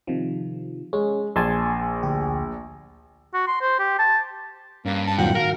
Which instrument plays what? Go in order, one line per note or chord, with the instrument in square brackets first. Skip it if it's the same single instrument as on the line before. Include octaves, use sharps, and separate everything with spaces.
[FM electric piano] C3 D#3 F3
[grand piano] G#3 [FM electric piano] C#4
[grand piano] A#1 [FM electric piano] G#5 A5 C6
[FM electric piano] D2 G4
[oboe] F#4
C6
C5
G4
A5
[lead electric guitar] G2 [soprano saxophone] A#3 [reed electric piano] C#4
[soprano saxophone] A5
[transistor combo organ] D#2 F4 G5 [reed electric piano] A#2 F#3 C4 [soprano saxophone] F#5
[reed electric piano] G#2 D#3 F#4 [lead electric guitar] A#4 [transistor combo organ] F5